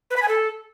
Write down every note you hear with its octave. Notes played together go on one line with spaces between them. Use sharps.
B4
B5
G#5
A4